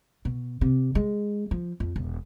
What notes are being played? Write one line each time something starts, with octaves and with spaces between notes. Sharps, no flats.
B2
C3
G#3
F3
F2
E1